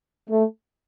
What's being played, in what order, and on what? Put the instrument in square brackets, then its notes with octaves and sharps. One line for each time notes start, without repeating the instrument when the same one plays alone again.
[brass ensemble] A3